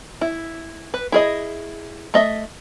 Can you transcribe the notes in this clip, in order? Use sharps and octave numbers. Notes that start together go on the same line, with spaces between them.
E4
B4
E4 G#4 D#5
A3 D#5 E5